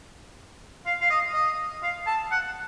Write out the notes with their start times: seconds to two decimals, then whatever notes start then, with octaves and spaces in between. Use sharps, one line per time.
0.86 F5
1.01 F5
1.10 D#5
1.34 D#5
1.83 F5
2.07 A5
2.31 F#5